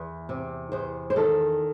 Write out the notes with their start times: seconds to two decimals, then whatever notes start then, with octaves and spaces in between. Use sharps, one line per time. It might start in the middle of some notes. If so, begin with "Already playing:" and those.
Already playing: E2
0.29 C3
0.72 E2 C5
1.10 C5
1.16 D#3 A4